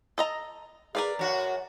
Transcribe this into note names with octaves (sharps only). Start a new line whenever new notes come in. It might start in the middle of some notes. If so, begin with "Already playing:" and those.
A4 D#5 A#5
G#4 A#4 B4 D5 F5
F#2 F#4 C#5